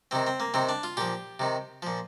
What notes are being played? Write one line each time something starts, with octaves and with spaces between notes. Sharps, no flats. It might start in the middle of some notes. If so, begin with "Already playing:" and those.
C3 D#3 C4
C4
A#3
C3 D#3 C4
D4
F4
A#2 F3 G4
C3 D#3
A#2 F3